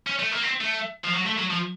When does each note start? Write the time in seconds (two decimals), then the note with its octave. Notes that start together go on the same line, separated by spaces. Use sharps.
0.07 C#4
0.19 A3
0.31 A#3
0.43 C4
0.60 A3
1.04 F3
1.14 F#3
1.26 A3
1.38 F#3
1.50 F3